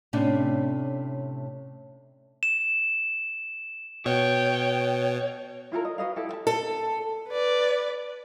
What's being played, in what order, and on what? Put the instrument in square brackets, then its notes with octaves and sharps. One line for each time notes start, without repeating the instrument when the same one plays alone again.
[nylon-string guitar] A2 C3 A3 C#4 D4
[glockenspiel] E7
[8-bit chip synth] B2 [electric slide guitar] C#5 [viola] G5
[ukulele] E4 F4 A4 A#4
D#5
F#4 B4 D#5 F5
E4 G4 A4
E5 A5
[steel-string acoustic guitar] A4
[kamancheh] B4 D5